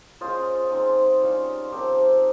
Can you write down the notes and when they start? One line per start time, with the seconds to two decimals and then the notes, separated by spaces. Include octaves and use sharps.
0.21 G#3 C#4 F4 C5 D#5
0.71 G#3 C4 D#4
1.22 G3 C#4 F4
1.72 F3 C4 D#4 G4 A#4